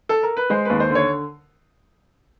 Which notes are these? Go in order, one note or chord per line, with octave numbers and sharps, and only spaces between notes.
A4
A#4
B4
G#3 C5
D#2 B4
C5
D3
C#5